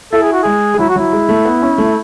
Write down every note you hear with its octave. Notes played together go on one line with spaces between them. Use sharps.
E4 A4
G#4
F#4
G#3 G#4
G#3
F#3 E4
F#4
F#3 E4
G#3
A3
B3
C#4
A3